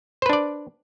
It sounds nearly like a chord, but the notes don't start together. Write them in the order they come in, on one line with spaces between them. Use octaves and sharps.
C5 B4 D4 D5